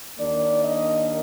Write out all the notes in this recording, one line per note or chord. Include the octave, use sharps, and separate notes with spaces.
D#2 D#3 A#3 D4 D5
D#5